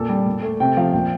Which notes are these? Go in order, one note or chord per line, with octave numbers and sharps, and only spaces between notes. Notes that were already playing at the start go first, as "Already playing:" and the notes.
Already playing: A#2 A4 A5
G3
A#2
A3
C3 G5
F3 F5
A#2 G5